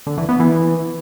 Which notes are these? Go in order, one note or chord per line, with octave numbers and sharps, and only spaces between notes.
D3
E3
B3
E3